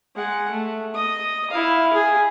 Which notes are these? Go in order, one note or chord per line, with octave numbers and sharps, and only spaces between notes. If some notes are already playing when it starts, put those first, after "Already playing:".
G#3 F#5
A3
D#5 D#6
E4 F5
G#4